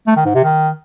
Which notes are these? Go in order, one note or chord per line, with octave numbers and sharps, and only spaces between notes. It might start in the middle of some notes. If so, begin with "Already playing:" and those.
A3
D#3
G#2
C3
D#3